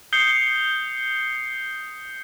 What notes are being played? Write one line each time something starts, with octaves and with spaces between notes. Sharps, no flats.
D#6 G6 C7 C#7 G7